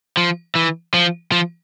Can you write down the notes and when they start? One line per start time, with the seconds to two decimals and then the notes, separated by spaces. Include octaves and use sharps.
0.17 F3
0.55 E3
0.94 F3
1.32 F3